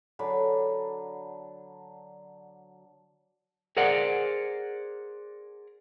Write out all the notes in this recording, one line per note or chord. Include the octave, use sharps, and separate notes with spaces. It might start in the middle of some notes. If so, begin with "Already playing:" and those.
D3 F#3 B5
G#4 A#4 C5 D5 F#5